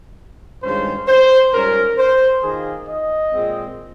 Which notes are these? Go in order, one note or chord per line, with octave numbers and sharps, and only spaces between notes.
G2 D#3 G#3 C#4 F4 C5
C5
G#2 G3 C#4 F4 A#4
C5
D#3 A#3 F4 G#4
D#5
A#2 G#3 C4